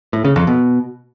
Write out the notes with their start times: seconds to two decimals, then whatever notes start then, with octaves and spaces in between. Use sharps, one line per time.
0.13 A2
0.25 C#3
0.36 F2
0.47 B2